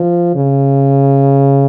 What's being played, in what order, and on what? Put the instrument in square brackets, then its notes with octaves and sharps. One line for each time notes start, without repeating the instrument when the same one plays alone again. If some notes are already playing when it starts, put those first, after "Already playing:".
Already playing: [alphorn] F3
C#3